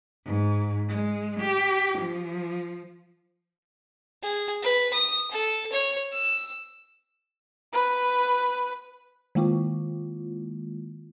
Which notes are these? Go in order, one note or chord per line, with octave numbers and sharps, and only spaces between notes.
G#2
G#3
G4
F3
G#4
B4
D#6
A4
C#5
E6
B4 B5
D#3 G#3 A#3 E4 F4